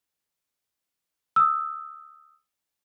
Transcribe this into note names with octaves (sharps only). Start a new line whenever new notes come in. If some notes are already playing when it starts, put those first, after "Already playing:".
D#6 E6